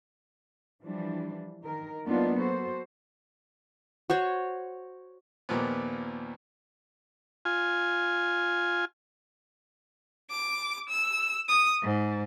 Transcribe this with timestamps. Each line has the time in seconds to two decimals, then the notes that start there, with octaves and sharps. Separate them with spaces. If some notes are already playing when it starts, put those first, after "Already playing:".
0.81 E3 F3 G3 D4
1.62 D#3 A#4
2.06 F#3 A#3 B3 D4 D#4 F4
2.38 F#4 A4 C5
4.10 F#4 C5 C#5
5.49 D#2 A#2 F3 B3
7.45 F4 G#5
10.30 D6
10.90 E6
11.48 D#6
11.82 G#2